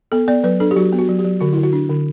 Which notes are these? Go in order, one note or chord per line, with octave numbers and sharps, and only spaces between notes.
B3 A4
B3 D5
F#3 B4
D4 A4
G4
F#3 F#4
B3
F#4
F#3
G4
F#3
D3 F#4
D3 E4
F#4
D4
D3